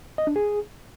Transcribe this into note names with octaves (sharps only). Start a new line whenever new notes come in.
D#5
D4
G#4